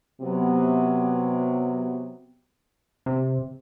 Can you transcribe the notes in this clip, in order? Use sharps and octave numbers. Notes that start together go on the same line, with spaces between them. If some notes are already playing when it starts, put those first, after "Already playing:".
C3 F#3 B3
C3